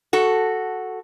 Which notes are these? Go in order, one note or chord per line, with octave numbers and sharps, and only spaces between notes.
F#4 A4